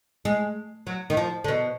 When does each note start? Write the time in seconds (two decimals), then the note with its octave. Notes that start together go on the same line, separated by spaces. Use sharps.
0.25 G#3
0.87 F#3
1.10 D#3
1.17 F3
1.44 D3
1.48 B2